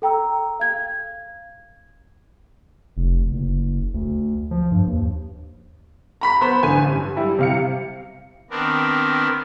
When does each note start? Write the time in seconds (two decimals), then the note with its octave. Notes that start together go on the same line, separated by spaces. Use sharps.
0.02 A4 G5 A#5 E6
0.60 F5 G#6
2.97 F1
3.32 F#1
3.94 D2
4.51 F3
4.72 G2
4.87 D#2
6.21 A#5 B5 B6
6.41 B3 C5 B5
6.63 A1 D3 G#5 D#7
6.88 G2
7.16 G3 E4
7.39 C3 F5 C#7
8.50 D#3 B3 C4 D4 A#4